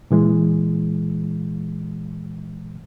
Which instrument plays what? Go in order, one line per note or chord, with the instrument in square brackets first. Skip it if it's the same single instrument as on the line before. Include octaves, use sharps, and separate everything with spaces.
[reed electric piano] A#2 E3 G#3